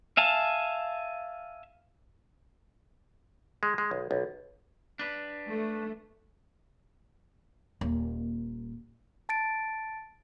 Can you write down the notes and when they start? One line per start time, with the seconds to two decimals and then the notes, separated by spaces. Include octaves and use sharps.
0.17 E5 F5 G#5 A5
3.63 G#3
3.78 G#3
3.91 B1
4.11 B1
4.99 D4 B4
5.48 A3
7.81 D#1 A#3
9.29 A5 A6 D7